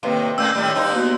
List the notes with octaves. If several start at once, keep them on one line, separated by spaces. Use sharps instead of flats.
A2 C3 D#3 A#3 B4 F5
A#2 A3 A#3 C#4 A4 E6 G6
A2 D#3 G3
G2 D#4 C#5 A5 C6
A#3 B3 F#4